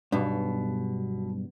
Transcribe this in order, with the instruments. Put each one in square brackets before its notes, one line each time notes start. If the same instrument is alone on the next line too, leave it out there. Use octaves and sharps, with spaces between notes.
[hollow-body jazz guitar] B1 G2 [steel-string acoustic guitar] B2